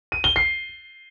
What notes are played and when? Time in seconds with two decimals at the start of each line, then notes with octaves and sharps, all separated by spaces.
0.12 D#7
0.24 G7
0.36 C7